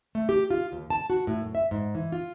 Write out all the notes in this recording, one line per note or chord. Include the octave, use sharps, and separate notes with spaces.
A3
G4
F4
D#2
A5
F#4
A2
F#2
E5
G#2
E3
F4